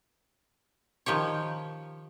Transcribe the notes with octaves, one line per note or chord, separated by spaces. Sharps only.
D#3 F3 G4 C#5